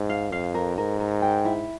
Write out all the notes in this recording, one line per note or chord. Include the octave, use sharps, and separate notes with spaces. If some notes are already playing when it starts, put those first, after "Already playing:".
Already playing: G#2
F5
F2 F5
A#4
G#2 A#4
A#4
G5
E4